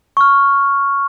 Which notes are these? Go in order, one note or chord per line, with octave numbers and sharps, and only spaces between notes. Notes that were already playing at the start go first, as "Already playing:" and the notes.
C#6 F6